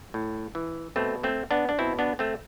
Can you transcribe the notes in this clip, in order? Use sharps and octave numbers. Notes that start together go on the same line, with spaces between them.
A2
E3
B2 A3 C4
A3 C4
B3 D4
D4
B2 C4 E4
B3 D4
A3 C4